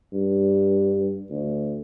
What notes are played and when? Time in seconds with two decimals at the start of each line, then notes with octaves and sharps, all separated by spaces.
0.13 G2
1.30 D2